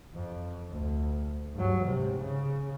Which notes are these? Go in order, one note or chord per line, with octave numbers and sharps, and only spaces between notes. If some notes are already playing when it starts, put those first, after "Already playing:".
F2
D2
G2 F#3
G#2 C3
C#3